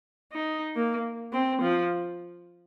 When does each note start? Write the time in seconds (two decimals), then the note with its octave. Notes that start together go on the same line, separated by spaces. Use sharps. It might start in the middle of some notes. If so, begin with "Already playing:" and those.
0.32 D#4
0.76 A#3
1.33 C4
1.62 F3